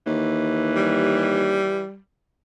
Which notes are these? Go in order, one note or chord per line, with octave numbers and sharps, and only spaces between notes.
D#2 E3
G3